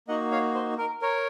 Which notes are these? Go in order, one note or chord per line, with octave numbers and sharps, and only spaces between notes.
A#3 D#4 F#4 D#5 F#5
C#5 F5
C5
A#4
A#4 C#5